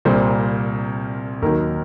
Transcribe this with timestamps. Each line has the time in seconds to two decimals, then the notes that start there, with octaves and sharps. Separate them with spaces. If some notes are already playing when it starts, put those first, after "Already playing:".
0.05 C2 A#2 G3 A#3 C5
1.42 D#2 D#3 F#3 A#4